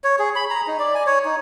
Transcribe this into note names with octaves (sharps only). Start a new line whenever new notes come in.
C#5
G#4
B5
A#5
D#4
D5
G#5
C#5
D#4